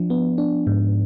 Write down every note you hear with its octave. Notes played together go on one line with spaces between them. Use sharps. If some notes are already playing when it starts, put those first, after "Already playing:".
Already playing: F3 D4
B3
D4
G#2